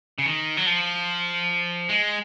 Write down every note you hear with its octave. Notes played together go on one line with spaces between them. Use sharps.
C#3
D#3
F#3
F3
G#3